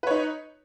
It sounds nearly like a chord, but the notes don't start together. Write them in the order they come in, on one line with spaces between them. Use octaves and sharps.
B4 C#5 D#4